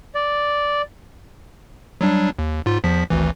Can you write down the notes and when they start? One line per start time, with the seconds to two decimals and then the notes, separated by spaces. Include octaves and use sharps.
0.15 D5
2.01 F#3 G3 D4
2.39 D#2
2.66 G#2 F4
2.84 E2 F3 B6
3.10 G#1 D2 E3